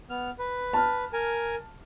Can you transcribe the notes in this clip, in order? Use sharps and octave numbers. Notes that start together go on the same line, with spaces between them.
B3 F6
B4
A5 F6
A#4 G#5